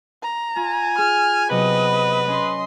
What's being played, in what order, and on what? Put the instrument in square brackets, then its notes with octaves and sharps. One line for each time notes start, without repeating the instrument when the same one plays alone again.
[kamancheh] A#5
[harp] F4 [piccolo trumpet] G#5
[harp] G#4 [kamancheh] F6
[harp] C3 F#3 [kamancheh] B3 D#5 [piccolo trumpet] B4
[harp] C#4 [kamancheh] D#5 C6